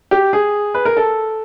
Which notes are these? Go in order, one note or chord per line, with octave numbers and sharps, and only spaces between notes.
G4
G#4
B4
A#4
A4